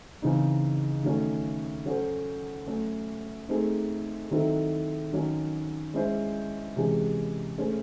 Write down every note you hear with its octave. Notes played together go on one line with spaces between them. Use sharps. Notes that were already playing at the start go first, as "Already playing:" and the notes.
C#3 E3 C4 D#4
D#3 F#3 A3 C#4
F#3 C#4 F#4 A4 C5
F#3 A3 C#4 F#4
A3 C4 D#4 G#4 C5
D#3 F#3 C4 E4 A4
D#3 F#3 C#4
G#3 C#4 E4 C5
C3 E3 G#3 C#4 G#4
A3 C#4 G#4 C5